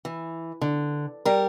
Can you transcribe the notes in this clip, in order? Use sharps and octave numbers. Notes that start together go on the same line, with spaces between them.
E3
D3
G3 A#4